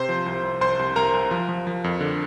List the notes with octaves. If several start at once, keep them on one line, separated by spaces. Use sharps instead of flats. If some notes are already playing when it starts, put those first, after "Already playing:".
Already playing: C3 C5 C6
F3
C2
C2
C2 C5 C6
C2
C2 A#4 A#5
C2
F3
F3
F3
F2
D3